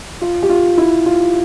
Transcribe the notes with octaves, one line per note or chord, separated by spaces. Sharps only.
F4
G4
F4
E4
F4